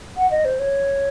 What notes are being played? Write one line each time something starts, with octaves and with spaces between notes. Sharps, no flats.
F#5
D#5
C5
C#5